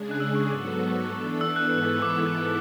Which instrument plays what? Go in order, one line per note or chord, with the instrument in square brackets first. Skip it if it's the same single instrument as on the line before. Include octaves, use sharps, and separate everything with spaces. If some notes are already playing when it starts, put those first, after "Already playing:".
Already playing: [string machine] C#3 G#3 D4 G#4
[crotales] F#6
E6
C#6
[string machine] G#2 F#3 B3 F#4 A4 [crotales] D6
[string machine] E3 B3 D4 A4
[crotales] E6
F#6
[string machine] G#2 E3 B3 E4 A4
[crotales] D6